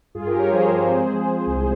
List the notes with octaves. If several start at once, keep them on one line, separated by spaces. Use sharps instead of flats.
G2 F4 G#4
G4 A#4
G2
A#4 C#5
F3 G#4 C5
C4
G#3
F3
F3
C2